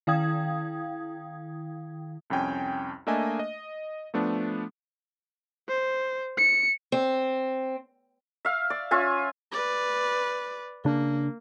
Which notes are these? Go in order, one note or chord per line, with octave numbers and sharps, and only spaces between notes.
D#3 E4 F5 G5 D#6 G#6
C2 F2 C#4 G5 G#5
A3 A#3 D4 D#5 E5 G#5
D#5
F3 A3 B3 D4
C5
C#7
C4
E5 F5
D5
C#4 F4 E5 G#5
B4 D5
C#3 A#3 D4